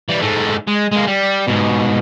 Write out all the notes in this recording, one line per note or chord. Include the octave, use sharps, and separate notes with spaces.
E3 G3
G#2 A3
G#3
G#3 A#3
G3
G#2 B2